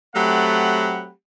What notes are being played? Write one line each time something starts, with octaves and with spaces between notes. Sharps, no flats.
F#3 A3 C4 G4 F#5 B5